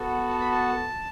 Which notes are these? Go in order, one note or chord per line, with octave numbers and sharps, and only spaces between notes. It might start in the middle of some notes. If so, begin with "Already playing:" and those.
Already playing: B3 F#4 A4
A5
B5
A5